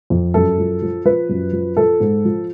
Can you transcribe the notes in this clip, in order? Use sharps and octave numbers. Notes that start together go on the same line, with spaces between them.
F2
F#2 A4
F3
F3
F3 B4
F#2
F3
F3 A4
G#2
F3